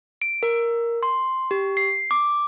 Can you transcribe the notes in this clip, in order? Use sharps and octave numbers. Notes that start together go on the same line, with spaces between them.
D7
A#4
C6
G4
C7
D6